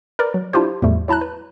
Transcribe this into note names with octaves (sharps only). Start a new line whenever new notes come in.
A#4 B4 D5
F#3
D4 E4 F4 G4 C5
E2 A2 F3 G3 A3
F#3 E4 A5 A#5 F#6
B4